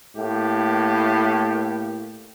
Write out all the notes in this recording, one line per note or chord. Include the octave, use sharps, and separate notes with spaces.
A2 A#3 G4